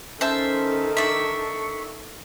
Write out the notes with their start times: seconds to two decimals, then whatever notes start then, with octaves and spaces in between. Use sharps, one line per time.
0.21 D#3 C#4 A4 C5 E5 A5
0.97 D4 E5 C#6